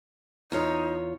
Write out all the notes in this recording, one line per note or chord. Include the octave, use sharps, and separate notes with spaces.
E2 D#4 F4 C#5